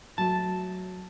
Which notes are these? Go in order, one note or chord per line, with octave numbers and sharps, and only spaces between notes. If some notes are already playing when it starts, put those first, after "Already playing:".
F#3 A3 A5